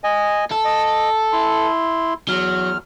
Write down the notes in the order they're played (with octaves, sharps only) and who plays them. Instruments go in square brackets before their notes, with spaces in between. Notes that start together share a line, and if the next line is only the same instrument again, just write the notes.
[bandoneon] D#5 G#5
[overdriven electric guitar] A4
[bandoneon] D#5
E4 C6
[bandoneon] E2 F6 [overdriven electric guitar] F#3